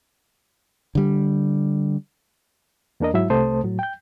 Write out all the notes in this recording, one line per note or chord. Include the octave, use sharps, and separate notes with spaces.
D3 G3
E2 A#3 D4 A#4 D#5
G#2 F#3 E4 E5
C2 C3 A3 C5 A5 D#6
A2 F#3
G5 G6